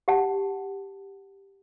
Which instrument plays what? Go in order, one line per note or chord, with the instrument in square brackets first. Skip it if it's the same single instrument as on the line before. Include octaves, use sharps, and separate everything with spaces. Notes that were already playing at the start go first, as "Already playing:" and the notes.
[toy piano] G4 F#5 A5